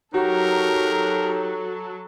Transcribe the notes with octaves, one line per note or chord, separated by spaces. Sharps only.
F#3 D#4 F#4 G4 A4 A#4 C#5